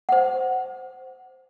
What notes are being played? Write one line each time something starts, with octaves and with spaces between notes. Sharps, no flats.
C5 F#5